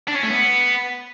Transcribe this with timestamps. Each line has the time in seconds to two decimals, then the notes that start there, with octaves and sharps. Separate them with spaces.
0.08 D4
0.16 C#4
0.23 A3
0.31 B3